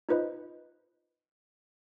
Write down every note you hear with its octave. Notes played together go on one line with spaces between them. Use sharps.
D#4 F4 B4 C5 D#5